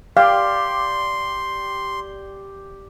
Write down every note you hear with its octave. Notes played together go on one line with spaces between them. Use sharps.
G4 D5 F5 G5 C6